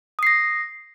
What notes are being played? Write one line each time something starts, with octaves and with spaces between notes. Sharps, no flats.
D#6 A#6 C7